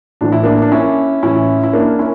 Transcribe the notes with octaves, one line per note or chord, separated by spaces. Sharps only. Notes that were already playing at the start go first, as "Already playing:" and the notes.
A2 E3 D4
E4
A#3 D4
D4
C#4 E4
A2 E3 C#4 E4
E4
A#3 D4
C#4 E4